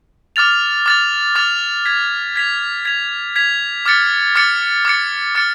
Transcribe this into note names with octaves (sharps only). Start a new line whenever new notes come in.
D6 F6 A6 F7
D6 F6 A6 F7
D6 F6 A6 F7
G#6 B6 F7
G#6 B6 F7
G#6 B6 F7
G#6 B6 F7
D6 F6 A6 C#7
D6 F6 A6 C#7
D6 F6 A6 C#7
D6 F6 A6 C#7